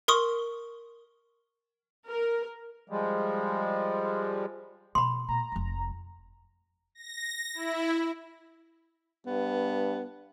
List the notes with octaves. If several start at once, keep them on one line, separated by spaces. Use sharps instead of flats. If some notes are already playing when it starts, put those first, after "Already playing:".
A#4 C6 C#6 D#6
A#4
F3 G3 G#3
B2 B5 C6
A#2 A#5
F1 F3
A#6
E4
G2 B3